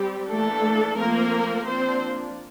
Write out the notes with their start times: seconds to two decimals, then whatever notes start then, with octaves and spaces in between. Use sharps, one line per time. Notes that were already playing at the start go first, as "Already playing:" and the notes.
Already playing: G3 C4 G4
0.29 E3 A3 A#3 D4 A4
0.97 F3 A3 A#3 C4 A#4
1.65 F3 A#3 C4 D4 C5